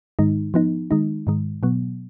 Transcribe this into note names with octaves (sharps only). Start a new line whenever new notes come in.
G#2 D#3 G#3 D#4
F3 B3 D#4
D#3 G#3 D#4
G#2 D#3 G#3
B2 F#3 B3